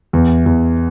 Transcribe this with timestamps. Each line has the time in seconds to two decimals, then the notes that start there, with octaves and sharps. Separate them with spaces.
0.13 E2
0.46 E2